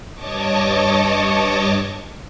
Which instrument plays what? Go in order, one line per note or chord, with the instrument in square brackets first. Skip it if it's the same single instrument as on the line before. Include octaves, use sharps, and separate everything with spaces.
[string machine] G2 C#5 D#5 A5 C#6 D6